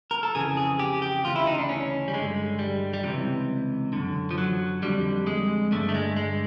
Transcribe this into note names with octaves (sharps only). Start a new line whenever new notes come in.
A#4
A4
F2 C#3 E3 G#4
G#4
G4
G4
D2 C#3 E3 F4
E4
D#4
D4
C#4
G3
G2 D3 G#3
G3
G3
C#2 C3 E3 F#3
F#2 D3
F3
F#3
F2 D3 G3
G#3
G2 D3 A3
A3
G#3
G#3